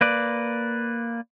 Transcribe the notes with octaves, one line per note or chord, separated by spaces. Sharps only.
A#3 B4 D5